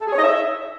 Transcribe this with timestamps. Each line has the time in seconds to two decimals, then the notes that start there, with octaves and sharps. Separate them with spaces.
0.01 A4
0.06 G#4
0.12 C#5
0.18 D#5
0.24 E5